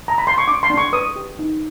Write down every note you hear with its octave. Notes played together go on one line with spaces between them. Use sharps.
A#5
B5
C6
C#6
D4 D6
C6
D4
C#6
B4 D#6
G4
D#4